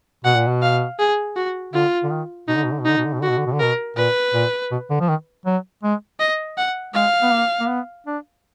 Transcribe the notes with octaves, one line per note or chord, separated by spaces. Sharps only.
B2 F#5
A#2
B2
F5
G#4
F#4
D3 F4
D3
D#3
B2 D#4
D3
B2
D3
B2
D3 D#4
B2
D3
B2
D3 F#4
B2
D3
B2
D3
B2 A#4
A#2 B4
A#2
B2
D3
F3
D#3
F#3
G#3
D#5
F#5
G#3 F5
B3
A#3
A#3
B3
D4